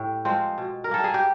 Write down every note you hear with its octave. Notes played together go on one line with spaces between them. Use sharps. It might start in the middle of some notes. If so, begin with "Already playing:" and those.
Already playing: A2 G4
F3 G#3 C4
B2
A#4
G3 A#3 A4
G#4
G4